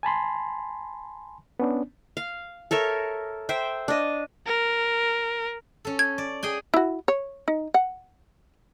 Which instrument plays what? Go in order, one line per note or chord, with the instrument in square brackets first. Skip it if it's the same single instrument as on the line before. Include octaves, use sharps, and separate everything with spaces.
[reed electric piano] G#5 A5 B5 C6
B3 C#4 D4
[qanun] F5
A4 A#4 C#5 E5
C5 E5 G5
D4 D#5
[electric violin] A#4
[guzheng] C#4 A4
[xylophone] G#6
[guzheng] D5
G#4 G5 G#5
[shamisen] E4 F#4
C#5
D#4
F#5